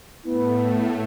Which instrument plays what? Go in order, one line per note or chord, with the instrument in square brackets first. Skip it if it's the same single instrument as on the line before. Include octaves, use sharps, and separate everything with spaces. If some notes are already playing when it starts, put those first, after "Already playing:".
[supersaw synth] A2 A3 [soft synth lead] B3 [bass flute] E4